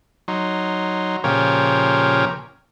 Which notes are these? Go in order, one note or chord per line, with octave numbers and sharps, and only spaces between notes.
F#3 D#4 C6
A#2 C#3 F3 G4 A#4 C#5